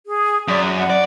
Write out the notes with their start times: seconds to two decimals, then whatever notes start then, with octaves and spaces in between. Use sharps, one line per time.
0.06 G#4
0.48 F#2 D5
0.65 F#4
0.77 F#5
0.90 D5